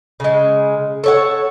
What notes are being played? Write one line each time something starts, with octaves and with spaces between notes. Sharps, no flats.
C#3 G#3
A4 C#5 F#5